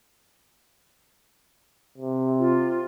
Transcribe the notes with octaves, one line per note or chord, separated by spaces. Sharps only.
C3
F4